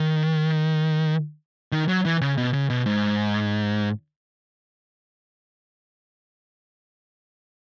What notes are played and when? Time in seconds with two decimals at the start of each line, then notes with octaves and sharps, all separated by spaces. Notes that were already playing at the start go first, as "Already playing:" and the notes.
Already playing: D#3
1.72 D#3
1.89 F#3
2.05 E3
2.21 C#3
2.38 B2
2.53 C#3
2.70 B2
2.86 G#2